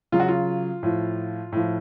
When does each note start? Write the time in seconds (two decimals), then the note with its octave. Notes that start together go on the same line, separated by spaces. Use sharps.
0.12 C#3 F#3 F4
0.20 F#4
0.28 F4
0.83 A2 F3
1.52 A2 F3